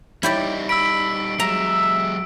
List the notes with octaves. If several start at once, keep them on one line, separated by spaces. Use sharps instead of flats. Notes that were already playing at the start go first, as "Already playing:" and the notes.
G3 D#4 E4 G4 D5
B5 E6 D7
F#3 G#3 E5 A#5